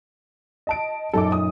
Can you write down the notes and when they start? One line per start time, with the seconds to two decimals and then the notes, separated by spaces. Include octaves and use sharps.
0.67 D#5 A5 D7
1.13 F#2 A#2 D#4 A4 D6
1.32 D#6